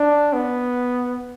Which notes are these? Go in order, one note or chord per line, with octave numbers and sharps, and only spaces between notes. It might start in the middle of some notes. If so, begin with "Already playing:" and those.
Already playing: D4
B3